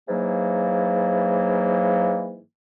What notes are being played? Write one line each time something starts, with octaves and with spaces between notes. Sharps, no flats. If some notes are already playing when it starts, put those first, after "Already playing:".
G#2 E3 F#3 A#3